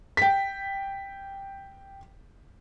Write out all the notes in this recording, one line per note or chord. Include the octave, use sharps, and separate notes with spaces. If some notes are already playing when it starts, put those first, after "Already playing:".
G5 B6